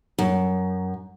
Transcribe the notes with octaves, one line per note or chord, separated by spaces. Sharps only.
F#2